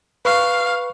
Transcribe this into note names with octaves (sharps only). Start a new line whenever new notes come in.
B4 F5 C#6